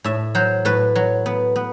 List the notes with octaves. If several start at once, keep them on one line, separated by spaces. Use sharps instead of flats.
A2 E5
F#3 C5
A2 B4
F#3
B3
B3